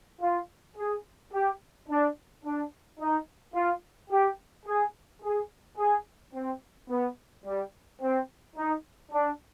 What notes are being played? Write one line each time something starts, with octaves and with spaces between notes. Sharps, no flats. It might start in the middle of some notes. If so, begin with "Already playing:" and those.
F4
G#4
G4
D4
D4
D#4
F4
G4
G#4
G#4
G#4
C4
B3
G3
C4
D#4
D4